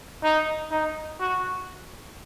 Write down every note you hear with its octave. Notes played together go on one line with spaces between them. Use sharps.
D#4
D#4
F#4